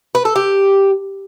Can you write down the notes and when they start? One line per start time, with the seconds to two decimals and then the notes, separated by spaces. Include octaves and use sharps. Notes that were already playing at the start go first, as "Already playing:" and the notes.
0.15 B4
0.25 A4
0.36 G4